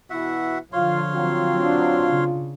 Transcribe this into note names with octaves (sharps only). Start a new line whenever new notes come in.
B2 E3 E4 F#4 E5 F#5
D3 F3 F4 C#5 F5 C6
F#3 C4 F4
D4
C#3